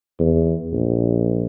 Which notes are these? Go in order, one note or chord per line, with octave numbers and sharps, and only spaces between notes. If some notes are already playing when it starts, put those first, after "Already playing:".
E2
A#1